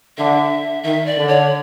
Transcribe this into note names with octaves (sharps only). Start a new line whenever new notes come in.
D3 E5
D#3 E5
D5
D3
C#5